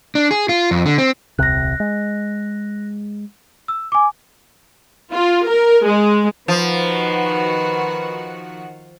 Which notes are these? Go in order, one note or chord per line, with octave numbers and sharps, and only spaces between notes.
D4
G#4
F4
F2
D3
C4
D#1 C2 C3 F#6 A#6
G#3
E6
G#5 D6
F4
A#4
G#3
D#3 F3 F#4 B4 F#5